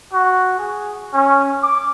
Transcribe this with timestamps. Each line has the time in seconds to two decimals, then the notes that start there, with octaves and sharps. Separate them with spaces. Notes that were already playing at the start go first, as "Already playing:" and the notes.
0.13 F#4
0.58 G#4
1.14 C#4
1.62 D6